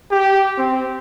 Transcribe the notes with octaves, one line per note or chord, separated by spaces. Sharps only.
G4
C4